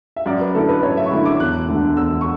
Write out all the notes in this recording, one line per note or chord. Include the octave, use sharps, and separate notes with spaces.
E5
F#2 D5
B4
D3 A3 E4 A4
B4
F#2 C#5
E5
C#6
D3 A3 E4 B5
D6
E1 F#6
D2 D3 A3
E1 E6
C#6